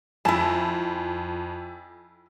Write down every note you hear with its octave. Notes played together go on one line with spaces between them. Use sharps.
F2 E4 G#5 A5